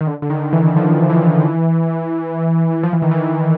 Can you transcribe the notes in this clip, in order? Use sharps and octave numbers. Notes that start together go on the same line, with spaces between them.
D#3
D3
D3
D#3
E3
E3
F3
E3
F3
E3
D#3
E3